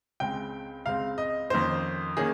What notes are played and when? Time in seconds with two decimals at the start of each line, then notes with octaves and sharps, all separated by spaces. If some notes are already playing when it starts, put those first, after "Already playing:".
0.20 C#2 C#3 G#3 C4 G5
0.86 C#2 C#3 G#3 C4 F5
1.18 D#5
1.50 F2 D#3 A#3 C#4 C5
2.17 D#3 A#3 C#4 G#4